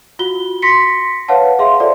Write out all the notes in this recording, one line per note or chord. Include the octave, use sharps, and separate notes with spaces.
F4 F#4 G7
C6 A#6 B6 C#7
B4 C#5 F5 F#5 A5
G#4 E5 F5 C6
F4 G#4 A4 C5 D5 E5